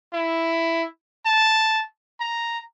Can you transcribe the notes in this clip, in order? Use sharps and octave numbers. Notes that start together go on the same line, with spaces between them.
E4
A5
A#5